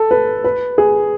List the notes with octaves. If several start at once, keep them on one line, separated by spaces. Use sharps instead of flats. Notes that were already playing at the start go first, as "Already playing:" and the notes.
Already playing: A4
B4
B4
G#4